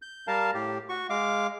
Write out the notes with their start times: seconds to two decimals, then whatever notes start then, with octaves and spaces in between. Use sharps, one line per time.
0.02 G6
0.27 G3 A#4 F5 A5
0.54 A2 G4
0.89 F#4 C#6
1.10 G#3 F5 D6